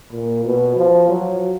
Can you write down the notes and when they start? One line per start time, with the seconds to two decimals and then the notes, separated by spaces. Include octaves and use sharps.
0.12 A#2
0.45 B2
0.76 F3
1.09 F#3